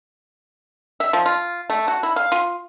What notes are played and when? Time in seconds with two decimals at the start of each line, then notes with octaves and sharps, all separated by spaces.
1.00 E5
1.13 F3
1.26 F4
1.70 A3
1.88 F#4
2.03 E4
2.16 F5
2.32 F4